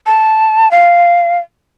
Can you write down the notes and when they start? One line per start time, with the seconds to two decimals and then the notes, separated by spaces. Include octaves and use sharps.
0.06 A5
0.71 F5